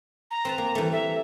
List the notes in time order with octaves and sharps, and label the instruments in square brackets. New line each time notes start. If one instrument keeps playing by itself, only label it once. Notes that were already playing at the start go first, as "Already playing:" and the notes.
[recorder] A#5
[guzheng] C4 B4 A5
A#3
E3 G3 A3
[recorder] E5